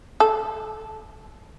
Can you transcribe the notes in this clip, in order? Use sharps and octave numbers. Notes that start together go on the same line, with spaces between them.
A4